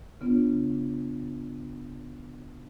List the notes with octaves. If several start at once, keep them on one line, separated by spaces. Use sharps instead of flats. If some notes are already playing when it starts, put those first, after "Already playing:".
C#3 B3 D4 F4